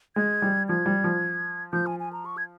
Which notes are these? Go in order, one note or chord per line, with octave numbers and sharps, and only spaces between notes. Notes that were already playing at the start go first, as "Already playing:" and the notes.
G#3 G#6
G3
F3 G#6
G3
F3
F3 G6
G#5
G#5
A#5
C#6
G#6